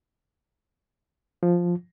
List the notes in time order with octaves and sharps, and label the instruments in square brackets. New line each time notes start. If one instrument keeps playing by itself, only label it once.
[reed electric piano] F3